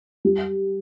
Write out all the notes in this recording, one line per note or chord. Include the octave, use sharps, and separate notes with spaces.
G3